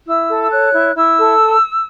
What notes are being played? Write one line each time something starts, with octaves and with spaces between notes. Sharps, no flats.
E4 E6
A4
E6
C#5 F#6
E4
E4 E6
A4